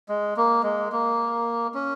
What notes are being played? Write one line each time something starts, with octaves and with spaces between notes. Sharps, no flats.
G#3
A#3
G#3
A#3
C#4